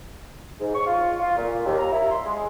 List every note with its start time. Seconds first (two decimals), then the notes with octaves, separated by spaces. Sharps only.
0.60 G#2
0.73 C#6
0.86 F4
1.19 F4
1.36 A#2
1.65 D#2
1.78 A#5
1.92 E4
2.10 C6
2.24 G#3